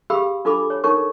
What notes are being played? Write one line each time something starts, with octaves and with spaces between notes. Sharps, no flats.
G4 G#4 F5 B5 E6
D4 F4 A4 B5 D6
C#5
D#4 A4 A#4 C#5 C#6